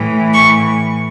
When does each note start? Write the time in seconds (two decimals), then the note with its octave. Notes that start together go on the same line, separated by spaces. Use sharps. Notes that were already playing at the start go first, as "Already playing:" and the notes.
Already playing: A2 E3
0.33 C#6